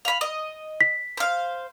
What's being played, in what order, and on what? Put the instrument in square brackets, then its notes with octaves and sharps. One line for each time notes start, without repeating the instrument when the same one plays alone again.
[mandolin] F5 B5
D#5
[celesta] B6
[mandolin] C5 F5